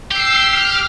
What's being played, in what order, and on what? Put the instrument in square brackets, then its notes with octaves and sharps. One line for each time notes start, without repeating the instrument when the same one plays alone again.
[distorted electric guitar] G4 [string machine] E6 C7
[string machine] F6